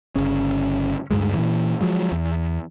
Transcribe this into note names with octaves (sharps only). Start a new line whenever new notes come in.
G1 C#3 C#4
D2 G2 F#3 G#3
A#2 E3
F3 F#3 G#3
E2